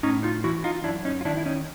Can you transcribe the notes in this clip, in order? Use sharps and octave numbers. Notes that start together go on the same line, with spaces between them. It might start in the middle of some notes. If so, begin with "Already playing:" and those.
A2 C#4 D#4
D#4 F4
E3 E4 F#4
D#4 F4
F#2 D4 E4
C#4 D#4
F4
D#3 D4 E4
E4
C#4 D#4